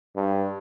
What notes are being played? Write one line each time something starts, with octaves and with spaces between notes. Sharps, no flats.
G2